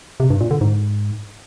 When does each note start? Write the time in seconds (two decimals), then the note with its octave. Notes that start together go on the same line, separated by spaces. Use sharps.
0.20 C3
0.30 G2
0.40 A#2
0.51 D3
0.61 G#2